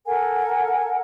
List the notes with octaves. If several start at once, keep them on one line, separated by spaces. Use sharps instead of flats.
A4 A#4 F#5 G#5